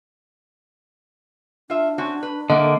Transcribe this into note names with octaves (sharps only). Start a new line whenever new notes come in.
D4 F4 E5
C4 C#4 F#4
B4
D3 A3 A#3 D#5 F#5